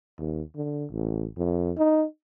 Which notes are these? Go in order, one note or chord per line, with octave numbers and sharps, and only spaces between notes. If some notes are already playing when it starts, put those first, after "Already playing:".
D#2
D3
A1
F2
D#4